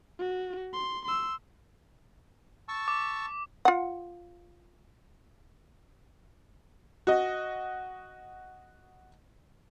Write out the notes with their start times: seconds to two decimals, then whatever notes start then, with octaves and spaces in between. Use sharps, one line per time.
0.19 F#4
0.73 C6
1.05 C6 E6
2.68 A5 C#6 E6
2.88 D6
3.65 F4 F#5
7.07 F#4 D#5